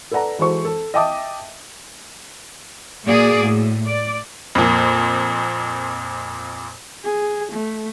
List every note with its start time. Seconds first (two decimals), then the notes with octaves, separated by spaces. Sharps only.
0.11 A4 B4 D5 F#5 A#5
0.39 E3 G#3 F#4 A4 C5 C#6
0.65 A4
0.94 D#5 E5 G5 A5 D6 D#6
3.06 A#2 A#3 F#4 G#4 D5
3.39 A2
3.86 D5
4.55 F2 A#2
7.05 G#4
7.53 A3